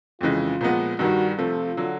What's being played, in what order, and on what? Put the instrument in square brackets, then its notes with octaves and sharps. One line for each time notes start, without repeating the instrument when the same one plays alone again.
[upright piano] F2 C#3 E3 G#3 [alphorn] F4
[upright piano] A#2 F3 G#3 B3
[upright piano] G2 D#3 G3 [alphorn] F#4
[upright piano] C3 F3 A3 [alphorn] F4
[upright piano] D3 F#3